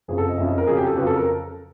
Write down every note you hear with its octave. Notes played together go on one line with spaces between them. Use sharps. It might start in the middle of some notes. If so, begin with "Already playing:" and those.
F#1 F2 C#3 G#4
A4
D#5
F#1 F2 C#3 E5
D#5
A#4
F2 C#3 F#3 G#4
G4
A4
F2 C#3 F#3 B4
A4
A#4